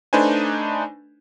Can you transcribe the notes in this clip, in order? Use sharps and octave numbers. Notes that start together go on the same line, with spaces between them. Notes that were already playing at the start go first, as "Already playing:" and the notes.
A3 D4 D#4 B4 C5 G#5